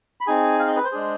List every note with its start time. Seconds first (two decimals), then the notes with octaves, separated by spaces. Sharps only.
0.21 B5
0.27 C4 D#4 G#4 G#5
0.59 F5
0.67 D#5
0.76 B4
0.85 C5
0.92 G#3 D4 G#4